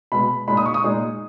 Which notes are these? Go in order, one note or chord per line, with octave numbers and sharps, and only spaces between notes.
B2 G#3 B3 B5
A#2 G#3 D#4 B5
D#6
C#6
D#6
A#2 G#3 D#4